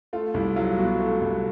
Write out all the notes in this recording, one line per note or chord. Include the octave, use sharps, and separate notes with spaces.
A3 F4
C2 E4
F#3 F4
B2 F#4
A3
C2